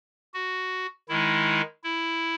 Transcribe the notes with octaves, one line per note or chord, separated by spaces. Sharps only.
F#4
D#3 G#3 D#4 E4
E4